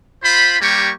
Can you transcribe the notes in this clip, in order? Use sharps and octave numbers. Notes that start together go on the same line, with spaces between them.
F4 C5 B5
G3 A#3 G4 C#6